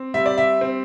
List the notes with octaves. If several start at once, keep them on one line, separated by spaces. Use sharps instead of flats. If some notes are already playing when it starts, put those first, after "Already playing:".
Already playing: C4
G3 E5
D5
E5
C4